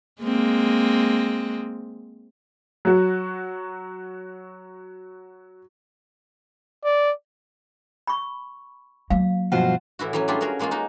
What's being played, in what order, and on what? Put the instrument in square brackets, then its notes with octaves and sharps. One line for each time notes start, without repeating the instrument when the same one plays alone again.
[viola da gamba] G#3 A#3 C4
[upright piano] F#3 F#4
[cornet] D5
[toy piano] B5 C#6
[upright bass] F#3 A#3 [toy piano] F5
[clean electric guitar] G2 B2 F3 [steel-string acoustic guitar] F4 F#4 C5 [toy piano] F#5
[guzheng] A2 E3 E4 F#4
E3 F#3 C#4
G3 A3 D4 F4 G4 G#4
C#4 F#4 G#4 A#4
E3 G#3 A#3 C#4 F4
A#3 D#4 F#4